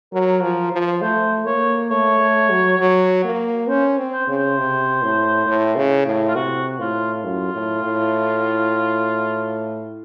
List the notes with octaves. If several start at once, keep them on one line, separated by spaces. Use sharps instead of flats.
F#3 A#4
F3
F3
A3 C5
A#3 C#5
A3 C#5
A3
F#3
F#3
A#3
C#4 C5
C4
C5
C#3
C5
C3
A2
A2
C#3
A2
F4
C3 F#4
A2 F4
F#2 F4
A2
A2